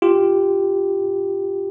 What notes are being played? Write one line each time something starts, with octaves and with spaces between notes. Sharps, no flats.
F4 G4